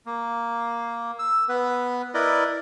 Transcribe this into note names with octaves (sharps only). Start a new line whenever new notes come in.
A#3
E6
B3 B4
E4 A#4 B4 D5 D#5